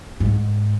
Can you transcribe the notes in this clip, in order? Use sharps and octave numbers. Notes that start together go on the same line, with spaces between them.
G#2